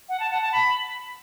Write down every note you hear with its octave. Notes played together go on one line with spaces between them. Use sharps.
F#5
A5
F#5
A5
B5